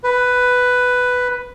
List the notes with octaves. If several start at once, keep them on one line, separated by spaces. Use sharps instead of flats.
B4